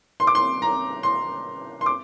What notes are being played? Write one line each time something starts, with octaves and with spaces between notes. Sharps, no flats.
C6
D6
C6
A#5
C6
C6
D6